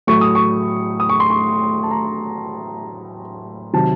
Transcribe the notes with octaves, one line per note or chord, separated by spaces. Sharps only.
A2 F#3 A3 C#6
D#6
C#6
D#6
C#6
C6
C#6
A5
A#5
C3 D#3 F#3 A5